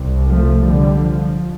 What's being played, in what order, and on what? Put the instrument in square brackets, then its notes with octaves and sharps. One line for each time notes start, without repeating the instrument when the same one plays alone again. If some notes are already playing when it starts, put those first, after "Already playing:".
Already playing: [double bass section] C2 C3
F3 A3
D3 G3
F3